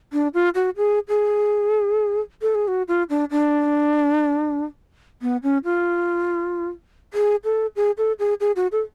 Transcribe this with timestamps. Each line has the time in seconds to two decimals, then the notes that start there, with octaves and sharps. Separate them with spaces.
0.13 D4
0.34 F4
0.55 F#4
0.77 G#4
1.09 G#4
2.42 A4
2.55 G#4
2.68 F#4
2.88 F4
3.10 D4
3.31 D4
5.22 B3
5.43 C#4
5.64 F4
7.13 G#4
7.44 A4
7.76 G#4
7.98 A4
8.19 G#4
8.40 G#4
8.56 F#4
8.72 A4